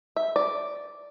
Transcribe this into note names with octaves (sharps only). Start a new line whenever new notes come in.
E5
D5